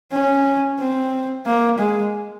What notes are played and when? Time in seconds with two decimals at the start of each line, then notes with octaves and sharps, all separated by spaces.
0.12 C#4
0.79 C4
1.46 A#3
1.79 G#3